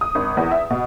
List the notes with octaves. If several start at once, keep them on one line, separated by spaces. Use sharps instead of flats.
D#6
G#1
E2
E5
B2